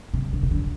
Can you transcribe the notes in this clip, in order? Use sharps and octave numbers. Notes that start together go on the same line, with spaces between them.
C3
D3
C3
D3